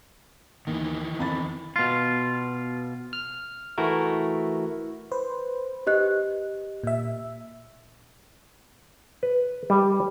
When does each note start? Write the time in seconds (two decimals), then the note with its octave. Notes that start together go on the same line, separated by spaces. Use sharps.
0.67 D#2 D#3 E3
1.19 F2 B5 A6
1.76 B2 F4
3.13 F6
3.78 E3 A3 E4 F#4 A#4
5.12 B4 C5
5.87 G4 D#5 F#6
6.84 A#2 E5
9.23 B4
9.70 G3